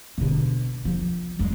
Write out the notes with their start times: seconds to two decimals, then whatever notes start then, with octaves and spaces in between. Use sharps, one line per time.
0.18 B2 D3
0.85 C2 F3
1.39 G3 G#3